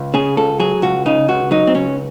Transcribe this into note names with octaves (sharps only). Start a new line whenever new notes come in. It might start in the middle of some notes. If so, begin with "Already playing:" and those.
Already playing: C#2
C#3 G#4
C#2 A4
F#3 G#4
C#2 F#4
C#3 D#4
C#2 F#4
F#3 D#4
C4
C#2 C#4